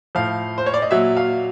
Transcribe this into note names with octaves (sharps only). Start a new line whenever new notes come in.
A2 F3 F5
C5
C#5
D5
D#5
A#2 F#3 E5
F5